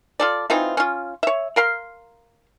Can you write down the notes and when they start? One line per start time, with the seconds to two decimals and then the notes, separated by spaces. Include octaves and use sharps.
0.20 F4 A4 D5
0.50 E3 C4 D#4 F4
0.77 C#4 F4
1.23 C#5 E5
1.56 A#4 F5 C6